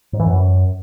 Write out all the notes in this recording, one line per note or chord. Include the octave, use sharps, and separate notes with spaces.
G#2
E3
F#2